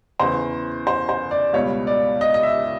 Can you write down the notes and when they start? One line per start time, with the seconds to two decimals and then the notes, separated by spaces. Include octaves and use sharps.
0.20 E2 C#3 E3 C5
0.87 C5
1.09 C5
1.31 D5
1.53 C#2 B2 G3 C#5
1.87 D5
2.21 D#5
2.34 D#5
2.43 E5